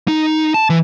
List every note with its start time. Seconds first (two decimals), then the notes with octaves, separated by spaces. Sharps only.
0.08 D#4
0.54 A5
0.70 E3